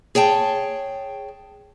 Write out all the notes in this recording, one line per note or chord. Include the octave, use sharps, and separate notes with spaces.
G#4 C#5 G5 A5